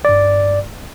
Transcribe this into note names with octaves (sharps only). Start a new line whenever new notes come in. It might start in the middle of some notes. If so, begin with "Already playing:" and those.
G2 D5